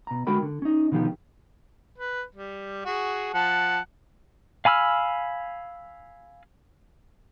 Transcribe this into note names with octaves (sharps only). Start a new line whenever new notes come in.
B2 A#5
D3 G#3 F#4 A#4 G5 B5
D3
C#4 D#4
B2 D3 D#3 F3 G4
B4
G3
F#4 G#4
F3 F#5 A5
F5 G#5 B5 E6 F6